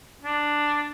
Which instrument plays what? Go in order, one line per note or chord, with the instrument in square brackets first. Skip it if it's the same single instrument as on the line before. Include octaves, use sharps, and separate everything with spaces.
[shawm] D4